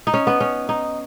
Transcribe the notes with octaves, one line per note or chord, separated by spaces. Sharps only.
D#4
C#4
B3
C#4
D#4